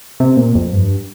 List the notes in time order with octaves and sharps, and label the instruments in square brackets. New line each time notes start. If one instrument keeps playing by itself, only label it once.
[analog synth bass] C3
A#2
F2
G2